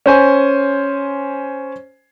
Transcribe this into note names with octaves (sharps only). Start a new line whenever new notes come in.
C#4 C5 G#5